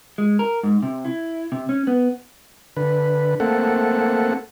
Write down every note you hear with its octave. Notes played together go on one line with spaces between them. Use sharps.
G#3
A#4
G#2
C3
E4
C3
C#4
B3
D3 B4
A3 A#3 C4 A4 F#5